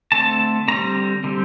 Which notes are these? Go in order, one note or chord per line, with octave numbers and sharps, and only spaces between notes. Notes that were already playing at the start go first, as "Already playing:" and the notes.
D3 A3 C4 A5
D3 G3 C4 A#5
D3 G3 C4